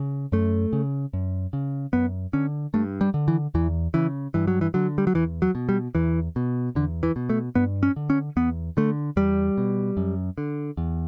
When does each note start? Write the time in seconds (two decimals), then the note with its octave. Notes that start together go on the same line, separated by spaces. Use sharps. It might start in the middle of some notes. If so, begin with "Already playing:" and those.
Already playing: C#3
0.32 F#2 A3
0.73 C#3
1.13 F#2
1.53 C#3
1.93 F#2 B3
2.33 D3 C#4
2.74 G2 A3
3.01 G3
3.14 D3
3.28 E3
3.55 E2 E3
3.94 C#3 E3
4.34 G2 E3
4.47 F#3
4.61 E3
4.74 D3 F#3
4.98 G3
5.07 F#3
5.14 E2 E3
5.42 F#3
5.55 B2
5.69 G3
5.95 E2 E3
6.36 B2
6.75 E2 D3
7.03 E3
7.16 B2
7.29 A3
7.55 G2 B3
7.83 C#4
7.96 D3
8.10 C#4
8.36 E2 B3
8.77 D3 A3
9.16 E2 G3
9.58 B2
9.97 F#2
10.38 D3
10.77 E2